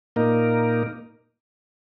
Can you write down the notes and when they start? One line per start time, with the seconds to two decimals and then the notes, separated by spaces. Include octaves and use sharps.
0.16 A#2 A#3 D#4 A#4